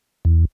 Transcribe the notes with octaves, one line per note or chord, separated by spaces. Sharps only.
E2